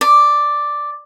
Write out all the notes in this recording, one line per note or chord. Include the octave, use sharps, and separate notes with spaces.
D5